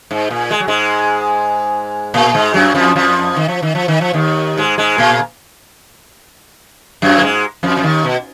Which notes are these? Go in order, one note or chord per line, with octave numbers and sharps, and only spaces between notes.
G#2
A#2
G#3
F#3
G#2 G#3
A#2 A#3
G#2 G#3
F#2 F#3
F2 F3
F2 F3
D#3
F3
D#3
F3
D#3
F3
D#2 D#3
G#2 G#3
G#2 G#3
A#2 A#3
F#2 F#3
A#3
G#2 G#3
F2 F3
F3
D#2 D#3
B2